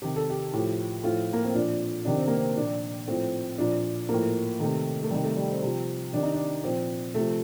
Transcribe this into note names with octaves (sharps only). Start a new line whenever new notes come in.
C3 D#3 G4
A4
G4
A2 F3 G4
A2 F3 F4
A#3
C4
A#2 F3 D4
C3 D#3 D4
C4
A#3
C4
A#2 F3 D4
A2 F3 C4
A#2 F3 D4
F3 A#3
A2
C3 D#3 A3
A3
C3 D#3 G3
A3
G3
C4
C3 F3
C3 D#3 D4
D#4
D4
A#2 F3 C4
C3 F3 A3